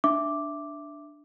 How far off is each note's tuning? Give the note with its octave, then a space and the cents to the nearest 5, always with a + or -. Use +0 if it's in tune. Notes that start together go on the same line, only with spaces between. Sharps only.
D4 +5 E5 +5 D6 +0